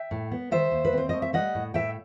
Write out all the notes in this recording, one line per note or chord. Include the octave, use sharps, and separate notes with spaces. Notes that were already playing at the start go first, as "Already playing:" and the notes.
Already playing: E5 G5
A2
B3
D#3 C5 E5
D#2
B4
C4 C5
A3 D#5
E5
G3 D#5 F#5
A2
A2 E5 G5